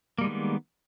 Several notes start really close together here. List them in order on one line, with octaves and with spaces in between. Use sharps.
A#3 G3 G#3 D#3 B3